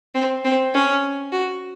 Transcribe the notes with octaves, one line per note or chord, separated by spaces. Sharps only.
C4
C4
C#4
F#4